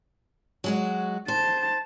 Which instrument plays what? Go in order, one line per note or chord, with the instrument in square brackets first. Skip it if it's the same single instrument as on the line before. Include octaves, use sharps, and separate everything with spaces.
[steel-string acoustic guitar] F#3 G#3 F#4
[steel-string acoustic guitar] C5 [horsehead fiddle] A5